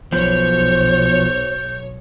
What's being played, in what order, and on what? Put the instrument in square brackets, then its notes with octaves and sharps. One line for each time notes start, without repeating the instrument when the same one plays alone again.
[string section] B1 C#5 [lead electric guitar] F3 B3 [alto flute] C5 [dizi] G6